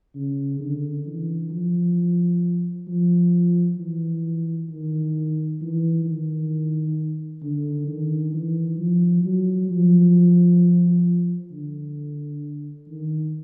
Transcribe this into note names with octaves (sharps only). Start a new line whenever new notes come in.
C#3
D3
E3
F3
F3
E3
D#3
E3
D#3
D3
D#3
E3
F3
F#3
F3
D3
D#3